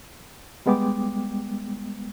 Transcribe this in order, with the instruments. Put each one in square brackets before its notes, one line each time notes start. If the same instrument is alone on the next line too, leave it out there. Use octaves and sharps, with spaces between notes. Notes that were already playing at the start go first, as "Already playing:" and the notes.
[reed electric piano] G3 G#3 B3 G5 D6